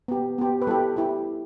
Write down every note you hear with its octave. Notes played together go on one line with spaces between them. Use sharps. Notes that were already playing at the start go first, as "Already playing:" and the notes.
B3 G4
B3 G4
B4
G3 E4 G4 A4
E4 G4